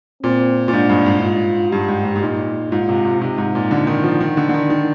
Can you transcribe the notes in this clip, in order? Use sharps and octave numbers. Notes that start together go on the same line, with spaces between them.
A#2 C4
A#2
G#2 D4
G2
G#2
F4
G2 G4
G#2
G#2
G#2
A#2 D#4
G#2 F4
C3
C3
C3 D#4
G#2
A#2
D3
D#3
F3
D#3 D4
D3
D3
D#3
D#3